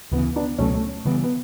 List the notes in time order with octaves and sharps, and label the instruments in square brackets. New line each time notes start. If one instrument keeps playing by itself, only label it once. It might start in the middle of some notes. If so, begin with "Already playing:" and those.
[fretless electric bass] D2 C#3 E3 [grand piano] B3
[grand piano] B3 D4
[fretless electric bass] C#2 B2 F#3 [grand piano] A3 C#4
[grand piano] A3
[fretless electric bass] C#3 E3 G3 [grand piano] B3
[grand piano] B3